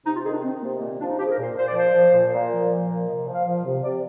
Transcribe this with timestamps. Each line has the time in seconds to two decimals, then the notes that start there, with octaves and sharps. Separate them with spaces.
0.05 C3 D#4
0.14 F4
0.24 D#3 G#4
0.33 D4
0.43 D#3 C4
0.62 C3 A#3
0.80 A#2 A#3
0.90 C4
0.99 F3 D4
1.08 D#4
1.18 F3 G4
1.25 G#4
1.31 A#4
1.38 A#2
1.43 C5
1.55 A#2 C5
1.67 D5
1.75 F3 C5
1.94 F3
2.13 A#2
2.32 A#2
2.51 F3
2.69 F3
2.88 A#2
3.07 C3 D#5
3.26 F3
3.32 F5
3.44 F3
3.64 C3
3.83 C3 D5